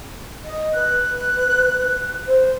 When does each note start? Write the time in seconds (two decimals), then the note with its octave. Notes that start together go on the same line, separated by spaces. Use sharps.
0.44 D#5
0.74 B4 F#6
2.26 C5